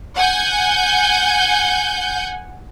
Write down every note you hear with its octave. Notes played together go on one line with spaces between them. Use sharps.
F#5 G#5 G6